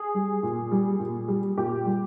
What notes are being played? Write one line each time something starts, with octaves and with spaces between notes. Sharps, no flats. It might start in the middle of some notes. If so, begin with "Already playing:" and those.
Already playing: G#4
G3
A#2
G3
A#2
G3
A#2 G4
G3